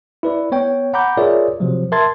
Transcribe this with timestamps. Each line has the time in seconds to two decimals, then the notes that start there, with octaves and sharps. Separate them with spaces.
0.23 E4 B4 D5
0.52 B3 C#5 G5
0.94 F#5 A#5 B5 D6 G6
1.17 F4 G#4 A#4 C#5 D5 E5
1.60 C3 F3 F#3
1.92 A#4 E5 A5 C6 G#6 A6